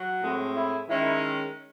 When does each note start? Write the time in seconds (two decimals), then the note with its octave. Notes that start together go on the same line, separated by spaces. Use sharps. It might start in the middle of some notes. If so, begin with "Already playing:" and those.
Already playing: F#3 F#4
0.21 A2 G#3 C4
0.55 E4
0.88 D#3 G#3 C#4 E4